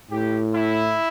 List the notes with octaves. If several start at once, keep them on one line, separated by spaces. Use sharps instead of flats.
A2 G4
E4